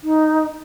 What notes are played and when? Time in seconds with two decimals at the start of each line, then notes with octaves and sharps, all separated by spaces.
0.03 D#4